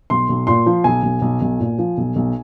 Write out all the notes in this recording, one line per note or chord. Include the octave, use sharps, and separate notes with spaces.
B1 C6
B1
A#2 C6
F3
B1 G#5
B1
B1
B1
A#2
F3
B1
B1